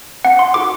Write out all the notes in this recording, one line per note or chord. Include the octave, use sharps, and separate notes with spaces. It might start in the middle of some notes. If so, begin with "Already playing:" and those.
C4 F#5
C6
D#4 F#4 A4 D6